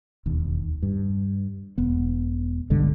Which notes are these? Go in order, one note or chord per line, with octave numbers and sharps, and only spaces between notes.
E1 D#2
G2
E1 B3
B1 G2 D3 G#3